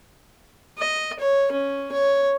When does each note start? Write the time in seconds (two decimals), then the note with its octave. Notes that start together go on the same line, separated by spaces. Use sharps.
0.78 D#5
1.19 C#5
1.52 C#4
1.92 C#5